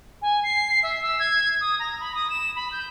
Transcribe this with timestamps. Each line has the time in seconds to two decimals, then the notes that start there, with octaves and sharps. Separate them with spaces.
0.22 G#5
0.43 C7
0.83 E5
1.02 E6
1.19 G#6
1.61 D#6
1.79 A#5
2.00 B5
2.14 D#6
2.30 E7
2.56 B5
2.72 G6